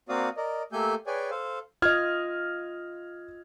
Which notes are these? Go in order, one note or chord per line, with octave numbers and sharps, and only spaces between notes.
A#3 C4 F#4 D5 F5 D#6
A#4 D5 D#5
A3 A#3 G4 A4 G#5 G6
G#4 B4 C#5 D5 G5 G#5
A4 C5 F5
F4 D#5 F6 G#6 F7